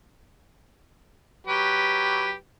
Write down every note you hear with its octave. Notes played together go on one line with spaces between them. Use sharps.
F#3 G4 B4